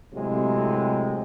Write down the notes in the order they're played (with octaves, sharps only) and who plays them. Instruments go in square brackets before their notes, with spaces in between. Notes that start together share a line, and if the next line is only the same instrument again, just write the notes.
[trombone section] A2 C3 F#3 G#3